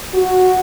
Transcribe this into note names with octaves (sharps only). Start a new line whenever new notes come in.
F#4